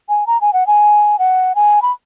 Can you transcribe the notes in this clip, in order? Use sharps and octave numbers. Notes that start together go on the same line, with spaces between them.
G#5
A#5
G#5
F#5
G#5
F#5
G#5
B5